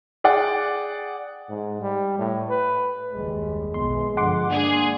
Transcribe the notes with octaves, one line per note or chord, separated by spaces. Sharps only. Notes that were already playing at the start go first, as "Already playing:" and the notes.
G#4 D5 F#5 G5
G#2
G3
A2
B4
F#1 D#2 G3 G#3
B1 E3 B3 C6
G2 D3 F3 F#5 C6 D6
G#3 A#3 D4 G#4